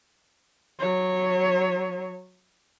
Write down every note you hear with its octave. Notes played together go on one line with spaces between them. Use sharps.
F#3 C#5